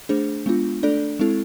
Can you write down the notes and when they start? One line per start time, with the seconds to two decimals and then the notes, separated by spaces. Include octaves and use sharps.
0.09 A3 D4 G#4 C5
0.46 G#3 B3 D4 F4
0.83 A3 D4 A4 D5
1.19 G#3 C4 E4 A4